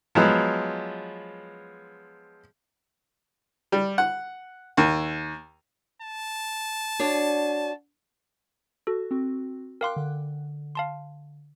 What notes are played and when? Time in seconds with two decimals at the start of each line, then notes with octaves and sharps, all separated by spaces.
0.15 F3 F#3 G#3 B3
3.72 G3
3.98 F#5
4.77 D#2
6.01 A5
6.99 D4 F#4 C#5
8.87 F#4 A4
9.11 C4 F#4
9.81 A#4 F5 G5 C6 D6 F#6
9.96 D3
10.75 F5 A5 C6